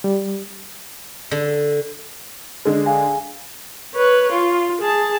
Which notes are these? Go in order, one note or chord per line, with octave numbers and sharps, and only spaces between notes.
G3
D3
D3 G#3
G#4 F5 G#5
B4 C#5
F4
G#4 A5